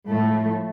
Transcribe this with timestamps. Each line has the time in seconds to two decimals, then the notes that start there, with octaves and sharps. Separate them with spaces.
0.08 A2 F3 A3